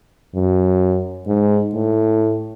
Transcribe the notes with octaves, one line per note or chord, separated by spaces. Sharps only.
F#2
G#2
A2